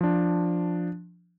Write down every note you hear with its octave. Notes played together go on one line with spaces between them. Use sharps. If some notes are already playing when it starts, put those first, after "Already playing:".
F3 D4